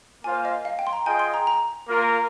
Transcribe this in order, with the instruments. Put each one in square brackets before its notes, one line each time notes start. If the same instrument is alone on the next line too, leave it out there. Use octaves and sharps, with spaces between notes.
[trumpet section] A#3 F4 C5 F5 [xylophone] G#5
[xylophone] D#5
F5
G5
C6
A#5
[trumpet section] F4 G#4 D#5 G5 [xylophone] G#5
[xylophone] C6
A#5
A#5
[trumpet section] A#3 F4 A#4